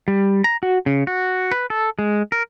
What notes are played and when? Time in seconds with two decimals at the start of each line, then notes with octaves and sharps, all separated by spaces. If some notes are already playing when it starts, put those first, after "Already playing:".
0.08 G3
0.44 A#5
0.63 F#4
0.86 C#3
1.07 F#4
1.52 B4
1.70 A4
1.99 G#3
2.32 A#4